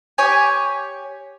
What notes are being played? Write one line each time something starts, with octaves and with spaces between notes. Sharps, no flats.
G4 C#5 G#5